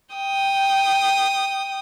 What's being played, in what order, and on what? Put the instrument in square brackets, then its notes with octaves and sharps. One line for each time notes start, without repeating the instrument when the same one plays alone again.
[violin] G5 D#6